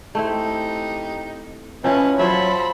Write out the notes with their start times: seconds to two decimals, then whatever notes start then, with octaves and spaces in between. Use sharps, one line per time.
0.15 A3 C4 D#4 E4 G4
1.84 F3 C#4 E4 B4 D#5 F#5
2.19 F3 F#3 C5 C#5 E5 A5 B5